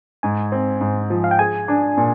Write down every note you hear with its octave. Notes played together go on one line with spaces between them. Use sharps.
G#2 G#5
C4
G#2
F3
F5
G5
G#4 G#5
D4
A#2